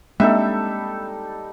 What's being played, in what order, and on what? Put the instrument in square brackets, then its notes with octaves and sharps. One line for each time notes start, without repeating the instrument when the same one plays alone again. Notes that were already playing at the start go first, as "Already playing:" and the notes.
[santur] G3 D#4 A4 [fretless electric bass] G#3 C4 D4 [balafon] A#3 [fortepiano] E5